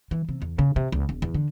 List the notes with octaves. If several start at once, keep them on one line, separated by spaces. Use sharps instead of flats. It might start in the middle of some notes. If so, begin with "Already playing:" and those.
E3
C3
E2
C#3
C3
C#2
E1
E2
D3